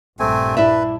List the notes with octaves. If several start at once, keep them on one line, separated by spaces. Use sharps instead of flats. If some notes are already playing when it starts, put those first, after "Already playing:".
A#1 G2 A3 C4 D4 G#5
E4 B4 D5 E5